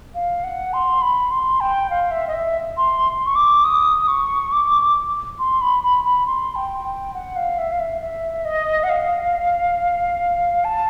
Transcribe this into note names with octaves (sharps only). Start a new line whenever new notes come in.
F5
F#5
C6
B5
C6
G5
F5
E5
D#5
E5
C6
C#6
D6
D#6
C#6
D6
C6
B5
B5
B5
C6
G5
G5
F#5
F5
E5
F5
E5
E5
D#5
F#5
F5
A5